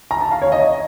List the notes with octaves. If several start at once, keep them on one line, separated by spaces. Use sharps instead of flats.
A#5
A5
F5
C#5
D#5